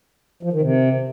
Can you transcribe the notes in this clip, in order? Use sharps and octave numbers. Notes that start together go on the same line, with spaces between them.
F3
D#3
C3